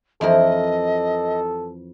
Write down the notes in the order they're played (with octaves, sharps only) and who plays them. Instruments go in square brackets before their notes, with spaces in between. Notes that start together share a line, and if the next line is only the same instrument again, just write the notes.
[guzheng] F2 E3 A#4 [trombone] A4 [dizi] D#5